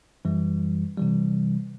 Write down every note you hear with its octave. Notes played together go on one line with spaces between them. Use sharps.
F#2 E3 G3
C3 E3 G3